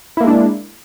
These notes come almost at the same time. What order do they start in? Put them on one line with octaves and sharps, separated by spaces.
E4 A#3 G#3 D4